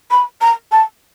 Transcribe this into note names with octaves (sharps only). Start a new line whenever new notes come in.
B5
A#5
A5